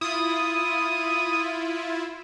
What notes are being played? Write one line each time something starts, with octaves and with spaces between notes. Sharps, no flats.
E4 F4 D#6